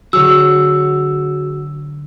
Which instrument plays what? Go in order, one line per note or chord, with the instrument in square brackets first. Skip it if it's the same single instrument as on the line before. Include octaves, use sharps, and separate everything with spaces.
[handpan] D3 F#3 [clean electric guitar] F#4 G#4 C#5 [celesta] E6